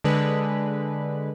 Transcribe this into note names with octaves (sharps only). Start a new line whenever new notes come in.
D3 G#3 B4